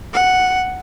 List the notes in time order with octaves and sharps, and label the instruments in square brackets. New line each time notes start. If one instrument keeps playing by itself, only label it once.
[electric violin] F#5